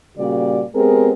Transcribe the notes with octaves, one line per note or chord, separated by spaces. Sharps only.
A#2 C#3 G3 F#4 G4 D5
G#3 B3 C4 G4 G#4 A#4